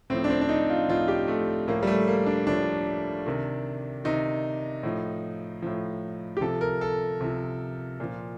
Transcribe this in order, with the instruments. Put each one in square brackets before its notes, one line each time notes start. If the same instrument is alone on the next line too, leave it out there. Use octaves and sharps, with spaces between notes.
[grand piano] A2 F3 C4
D4
C4
D4
D#4
F4
A2 F3 F4
G4
A3
A2 F3 A#3
G3
A3
A#3
D4
A2 F3 D4
C3 D#3
C3 D#3 D#4
A2 F3
A2 F3
G4
C3 F3 A4
A#4
A4
C3 F3
A#2 F3